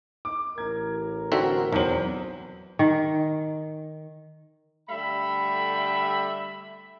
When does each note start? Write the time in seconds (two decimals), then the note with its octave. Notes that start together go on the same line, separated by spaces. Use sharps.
0.25 D6
0.58 A1 A#4 G#6
1.32 D3 C4 F#4 E5
1.73 B1 E2 F#3 C4 F#7
2.79 D#3
4.89 D3 G3 A3 E5 B5